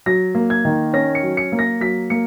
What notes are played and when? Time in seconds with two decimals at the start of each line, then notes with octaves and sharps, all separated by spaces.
0.06 F#3 A#6
0.35 A#3
0.50 G#6
0.65 D#3
0.94 C#4 A#6
1.15 C#7
1.23 F#3
1.37 C#7
1.52 A#3
1.59 A#6
1.81 F#3 B6
2.10 A#3 C#7